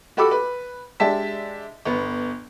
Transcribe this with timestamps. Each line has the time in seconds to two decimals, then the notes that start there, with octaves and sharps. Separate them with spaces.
0.17 F#4 G4 A4 B5 D6 E6
0.31 B4
1.00 G#3 D4 G4 E5 A5 B6
1.85 G1 B3